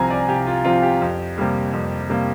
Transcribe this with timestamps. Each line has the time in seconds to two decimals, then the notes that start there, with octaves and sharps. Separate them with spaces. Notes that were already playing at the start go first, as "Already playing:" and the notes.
Already playing: C2 C3 F3 C4 F5 G#5 A#5
0.10 D5
0.28 C2 G4
0.47 F4
0.65 C3 F3 C4 F4
0.82 G4
1.02 F2
1.38 C3 G3 A#3
1.73 F2
2.10 C3 G3 A#3